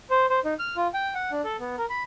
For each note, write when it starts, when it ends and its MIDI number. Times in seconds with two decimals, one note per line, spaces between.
0.10 0.26 72
0.30 0.40 72
0.45 0.54 63
0.59 0.76 89
0.76 0.87 65
0.94 1.14 79
1.15 1.31 78
1.32 1.42 62
1.44 1.57 69
1.60 1.76 59
1.78 1.86 70
1.90 2.03 83